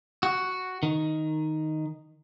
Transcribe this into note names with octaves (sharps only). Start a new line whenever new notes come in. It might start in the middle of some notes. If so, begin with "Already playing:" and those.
F#4
D#3